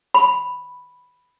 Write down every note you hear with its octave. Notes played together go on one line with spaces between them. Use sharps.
B5